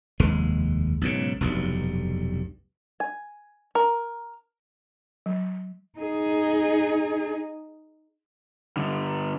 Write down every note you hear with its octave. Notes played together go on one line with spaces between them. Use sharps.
F1 D#2 G#3
B1 G#2 C#3
F1 B1 G2
G#5
A#4
F#3
D#4 G#4
G2 D3